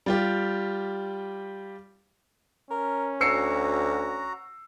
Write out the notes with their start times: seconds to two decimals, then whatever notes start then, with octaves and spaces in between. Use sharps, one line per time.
0.06 G3 F4 G4
2.71 C#4 A#4
3.21 D2 F#4 A#5 E6 C7 C#7